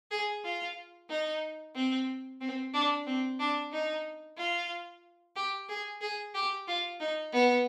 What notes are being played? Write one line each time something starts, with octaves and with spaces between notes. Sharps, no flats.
G#4
F4
D#4
C4
C4
D4
C4
D4
D#4
F4
G4
G#4
G#4
G4
F4
D#4
B3